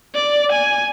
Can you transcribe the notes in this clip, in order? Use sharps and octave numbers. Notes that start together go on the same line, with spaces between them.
D5
G#5